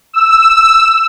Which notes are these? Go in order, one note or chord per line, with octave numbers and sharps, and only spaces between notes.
E6